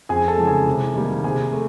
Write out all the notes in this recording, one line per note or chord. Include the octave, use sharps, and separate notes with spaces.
F2 G#4 G#5
A4 A5
C#3 E3 G#3
G#4 G#5
C3
D#3 G3 A#3
C3 G#4 G#5
A3